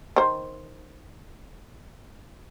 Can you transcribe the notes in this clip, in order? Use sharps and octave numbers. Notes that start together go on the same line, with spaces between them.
D#3 C5